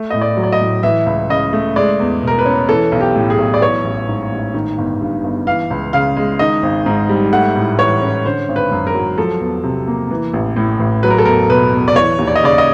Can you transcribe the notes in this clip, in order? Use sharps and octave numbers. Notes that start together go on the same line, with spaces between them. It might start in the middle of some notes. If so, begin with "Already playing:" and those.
Already playing: A3
A2 D#5
D5
F#3
D5
D#5
A2
E3 E5
C#2
C#3 D#5
A3
G#3 D5
E2
B2
A#4
B4
C#4
E3 A4
B1
G4
A2
G#4
B1
D5
E3 C#5
A1
G#2
A1
D#3
G1
G2
G1
E3 F5
C#2
C#3 F5
G#3
D#3 D#5
G#1
G#2
G3
A3 F#5
A2
E3 C#5
C#4
D3 C5
G#1
B4
F#2
A#4
F#3
F3 A4
E2
C3
A#3
E3
A1
A2
A1
F#3 B4
A#4
A4
E2 A#4
B2 B4
E2
D5
E3 C#5
D#2
D5
D#5
C#3 D5
D#5